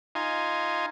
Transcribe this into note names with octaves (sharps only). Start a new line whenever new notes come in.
D#4 F4 G#5